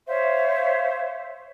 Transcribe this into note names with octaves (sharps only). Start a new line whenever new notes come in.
C5 C#5 E5 F5